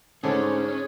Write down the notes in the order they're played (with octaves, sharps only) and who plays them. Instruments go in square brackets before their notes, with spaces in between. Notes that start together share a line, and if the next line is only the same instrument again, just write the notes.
[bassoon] G#2 [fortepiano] D3 A3 [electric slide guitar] C#4 [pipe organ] G#4 C#5